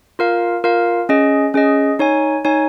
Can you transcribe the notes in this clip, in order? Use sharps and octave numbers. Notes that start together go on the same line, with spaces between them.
F4 A#4 F5
F4 A#4 F5
C#4 G#4 D#5
C#4 G#4 D#5
D#4 C#5 G#5
D#4 C#5 G#5